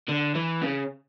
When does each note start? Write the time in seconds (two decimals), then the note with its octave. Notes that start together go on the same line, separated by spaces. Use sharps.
0.08 D3
0.35 E3
0.62 C#3